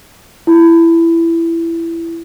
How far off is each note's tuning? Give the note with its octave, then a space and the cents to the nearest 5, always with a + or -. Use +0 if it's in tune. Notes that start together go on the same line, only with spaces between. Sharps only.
E4 +15